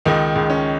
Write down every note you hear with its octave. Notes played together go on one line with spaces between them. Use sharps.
C#2 D#3 D#4
C#2
C#4